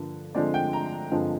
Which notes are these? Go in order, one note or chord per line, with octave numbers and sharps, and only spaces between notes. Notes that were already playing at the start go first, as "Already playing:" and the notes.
Already playing: G2 D3 F3 A#3
D3 F3 G#3 C4 D5
G5
A#5
G2 D3 F3 G#3 C4